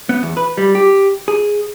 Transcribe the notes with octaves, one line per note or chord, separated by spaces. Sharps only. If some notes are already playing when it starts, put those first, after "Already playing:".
B3
E2
B4
G3
G4
G#4